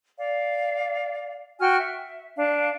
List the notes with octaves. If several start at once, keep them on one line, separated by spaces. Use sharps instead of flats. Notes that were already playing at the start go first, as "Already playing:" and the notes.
D5 F5
F#4 G5 G#5 F6
E5
D4 F5